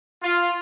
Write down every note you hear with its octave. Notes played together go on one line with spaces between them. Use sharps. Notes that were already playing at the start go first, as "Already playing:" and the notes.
F4